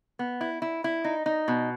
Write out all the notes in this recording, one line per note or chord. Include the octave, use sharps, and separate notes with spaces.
B3
E4
E4
E4
D#4
D#4
B2